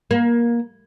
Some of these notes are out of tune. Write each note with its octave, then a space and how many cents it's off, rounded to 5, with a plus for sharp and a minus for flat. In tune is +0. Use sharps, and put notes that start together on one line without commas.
A#3 +20